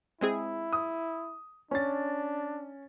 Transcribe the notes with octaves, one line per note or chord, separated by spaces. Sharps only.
G#3 C4 E4 G#4
D#6
C#4 D4 A6